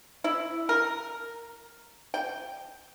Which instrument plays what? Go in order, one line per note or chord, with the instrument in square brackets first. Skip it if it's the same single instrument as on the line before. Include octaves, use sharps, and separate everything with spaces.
[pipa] E4
A#4
G5